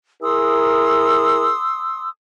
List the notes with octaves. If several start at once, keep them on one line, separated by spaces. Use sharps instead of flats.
E4 G#4 A#4 C6 D#6 E6